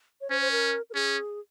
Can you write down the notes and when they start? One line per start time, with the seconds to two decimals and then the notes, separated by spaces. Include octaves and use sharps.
0.21 C#5
0.30 C#4 C5
0.41 C5
0.52 A#4
0.90 A#4
0.94 C#4 G#4